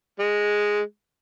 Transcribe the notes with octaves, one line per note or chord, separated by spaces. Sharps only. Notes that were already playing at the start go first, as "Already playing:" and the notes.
G#3